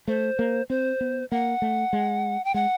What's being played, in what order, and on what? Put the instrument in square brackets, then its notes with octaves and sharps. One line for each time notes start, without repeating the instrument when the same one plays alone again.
[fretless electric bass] A3 [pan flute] C5
[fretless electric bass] A#3
[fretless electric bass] C4 [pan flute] C5
[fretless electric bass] B3
[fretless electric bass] A#3 [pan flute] F#5
[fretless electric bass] A3
G#3
[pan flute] G5
[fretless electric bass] G#3 [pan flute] F#5